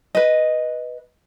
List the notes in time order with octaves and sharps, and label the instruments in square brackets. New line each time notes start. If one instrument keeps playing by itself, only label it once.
[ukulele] B4 D#5